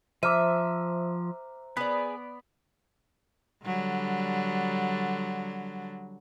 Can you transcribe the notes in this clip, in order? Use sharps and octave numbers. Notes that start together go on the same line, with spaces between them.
F3 C5 E5 A#5 D6 F6 D#7
B3 G#4 B4 D5
D3 F#3 G3